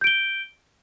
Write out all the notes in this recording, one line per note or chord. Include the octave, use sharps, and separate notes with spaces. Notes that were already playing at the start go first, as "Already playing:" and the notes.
G6 D7 G7